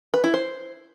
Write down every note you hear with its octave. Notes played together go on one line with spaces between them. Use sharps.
B4
E4
C5